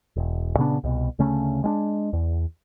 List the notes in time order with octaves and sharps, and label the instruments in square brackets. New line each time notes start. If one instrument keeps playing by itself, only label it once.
[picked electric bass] E1
A#2 C#3 B3 D4
C2 B2
D2 C#3 A3 C#4
G#3 C#4 D4
E2